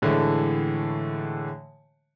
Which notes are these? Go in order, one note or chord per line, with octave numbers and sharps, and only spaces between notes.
A2 D3 E3 G#3 A3